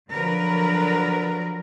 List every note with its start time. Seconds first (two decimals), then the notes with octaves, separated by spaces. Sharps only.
0.10 D3 F3 F#3 A#4 B4